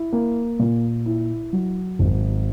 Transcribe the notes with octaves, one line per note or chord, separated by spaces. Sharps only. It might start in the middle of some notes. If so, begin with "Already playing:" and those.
Already playing: E4
A#3
A#2
E4
F#3
G#1